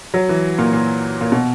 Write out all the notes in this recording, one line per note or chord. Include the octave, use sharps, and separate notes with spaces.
F#3
E3
A#2
A#2
A#2
B2